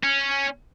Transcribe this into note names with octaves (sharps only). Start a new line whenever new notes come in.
C#4